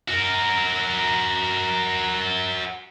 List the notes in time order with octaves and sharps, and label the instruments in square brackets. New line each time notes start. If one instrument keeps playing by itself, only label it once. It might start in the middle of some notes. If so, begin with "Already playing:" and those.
[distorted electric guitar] F#4 A#4